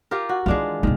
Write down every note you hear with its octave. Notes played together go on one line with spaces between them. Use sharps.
F4 G4 A#4
F#4
D#3 E3 G#3 D4 F4
E1 D#3 A#3